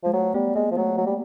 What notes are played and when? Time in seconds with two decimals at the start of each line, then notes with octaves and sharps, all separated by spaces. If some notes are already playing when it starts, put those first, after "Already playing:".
0.04 F3 G#3
0.13 F#3 A3
0.34 G3 B3
0.55 G#3 A#3
0.71 F3
0.77 F#3 A3
0.98 F#3 A#3
1.06 G3